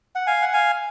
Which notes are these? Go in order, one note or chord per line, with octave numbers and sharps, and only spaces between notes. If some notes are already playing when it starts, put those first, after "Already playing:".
F#5
F5 G#5
F#5
F5 G#5